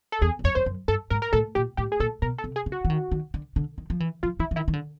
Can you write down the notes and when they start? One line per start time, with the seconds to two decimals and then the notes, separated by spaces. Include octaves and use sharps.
0.12 A4
0.21 E2 G#4
0.39 F#2
0.44 F2 C#5
0.55 F2 C5
0.66 F#2
0.88 G2 A4
1.10 G#2 A#4
1.22 A#4
1.33 A2 A4
1.55 A#2 G4
1.77 A2 G4
1.92 G#4
2.00 A#2 A4
2.22 B2 A#4
2.38 A4
2.44 C3
2.56 G#4
2.66 C#3
2.72 F#4
2.85 E3
2.90 D#3
3.12 D#3
3.34 D3
3.56 D3
3.78 D#3
3.90 F3
4.00 E3
4.23 F3 F4
4.39 E3 E4
4.51 E3
4.56 D#3 E4
4.68 D#3
4.73 D3